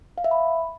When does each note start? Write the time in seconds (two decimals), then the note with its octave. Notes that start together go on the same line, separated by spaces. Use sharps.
0.18 F5
0.24 E5
0.31 B5